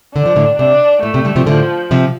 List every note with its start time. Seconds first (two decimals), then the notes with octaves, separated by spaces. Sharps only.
0.16 D3 D4
0.26 F3
0.36 A2 D3
0.59 C3 D4
1.03 A2 A3
1.14 C3
1.25 D3 G3
1.36 C3 F3
1.47 A2 D3 F3
1.91 C3 F3